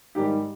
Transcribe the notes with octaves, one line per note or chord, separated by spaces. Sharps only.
G#2 D#3 G3 G4